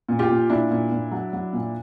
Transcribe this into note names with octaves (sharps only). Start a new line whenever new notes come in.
A#2
F4 G4
A#2
A#2 D4 E4
A#2
A#2
F#3
F#3
A#2